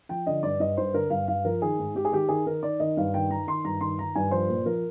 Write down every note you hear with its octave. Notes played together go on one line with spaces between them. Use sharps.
F3 G5
D3 D#5
G2 D5
G2 D#5
G2 C5
D3 A#4
G2 F5
G2 F5
F3 A#4
D#3 G#4
G#2
G#2 G4
G#4
D#3 G4
D#3 G#4
D#3 A#4
D#3 D5
D#3 D#5
G2 F5
D#3 G5
D#3 A#5
D#3 C6
G2 A#5
D#3 C6
D#3 A#5
G2 G#5
F3 C5
A#2
F3 A#4